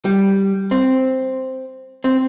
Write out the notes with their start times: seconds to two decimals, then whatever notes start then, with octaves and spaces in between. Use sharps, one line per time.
0.05 G3
0.71 C4
2.04 C4